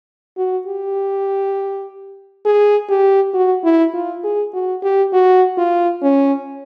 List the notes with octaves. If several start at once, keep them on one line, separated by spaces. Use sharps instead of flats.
F#4
G4
G#4
G4
F#4
E4
F4
G#4
F#4
G4
F#4
F4
C#4